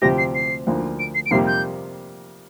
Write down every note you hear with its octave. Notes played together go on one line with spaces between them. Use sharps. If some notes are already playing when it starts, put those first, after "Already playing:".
D2 C3 F3 C4 G4 A#6
C7
C7
D2 D3 F3 A#3
D7
C7
D7
F2 C3 G3 A#3 G4 C7
G6